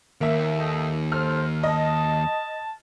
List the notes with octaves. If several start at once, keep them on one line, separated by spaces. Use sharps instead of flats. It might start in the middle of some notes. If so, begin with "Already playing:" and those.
D#2 A#3 E5
D#4 A4
A4 C5 F6
D#5 A5